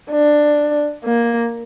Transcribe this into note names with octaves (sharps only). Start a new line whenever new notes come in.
D4
A#3